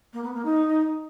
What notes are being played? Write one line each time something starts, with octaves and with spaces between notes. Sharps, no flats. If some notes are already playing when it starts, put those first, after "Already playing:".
A#3
B3
A#3
D#4